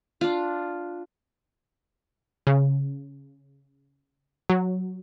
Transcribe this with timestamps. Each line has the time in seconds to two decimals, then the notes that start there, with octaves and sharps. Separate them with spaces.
0.21 D4 F4
2.47 C#3
4.50 F#3